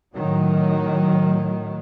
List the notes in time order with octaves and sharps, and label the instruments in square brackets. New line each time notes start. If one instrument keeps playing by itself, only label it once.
[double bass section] A2 D#3 F#3